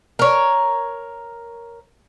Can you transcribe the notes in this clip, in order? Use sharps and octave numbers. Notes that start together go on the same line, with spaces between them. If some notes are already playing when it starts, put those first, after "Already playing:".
A#4 C#5